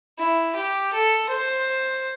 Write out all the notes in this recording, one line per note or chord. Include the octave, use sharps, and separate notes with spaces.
E4
G4
A4
C5